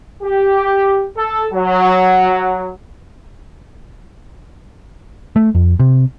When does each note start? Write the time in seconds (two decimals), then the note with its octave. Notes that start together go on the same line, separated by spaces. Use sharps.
0.23 G4
1.15 A4
1.53 F#3
5.36 A3
5.55 F2
5.80 C3